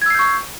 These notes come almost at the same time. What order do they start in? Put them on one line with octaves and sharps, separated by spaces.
G#6 E6 C7 G6 C#6